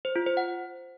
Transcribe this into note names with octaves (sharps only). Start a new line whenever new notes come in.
C5
F4
C5
F#5